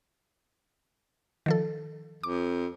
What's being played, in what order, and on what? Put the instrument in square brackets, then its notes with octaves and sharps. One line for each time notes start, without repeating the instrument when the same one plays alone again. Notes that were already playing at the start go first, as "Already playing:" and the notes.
[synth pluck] D#3 F3 A4
[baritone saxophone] F2 [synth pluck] D6